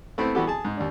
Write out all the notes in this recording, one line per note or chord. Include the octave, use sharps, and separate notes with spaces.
A3 B3 C4 E4
E3 G3 B3 F#4 G4 A4
G#4 A5
G#2
D#2 D4